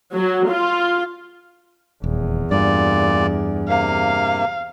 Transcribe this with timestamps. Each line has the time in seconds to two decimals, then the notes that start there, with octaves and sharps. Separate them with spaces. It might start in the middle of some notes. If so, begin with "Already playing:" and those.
0.13 F#3
0.49 F4
2.04 D#1 E2
2.51 G2 A#2 D5
3.69 C3 A#3 F5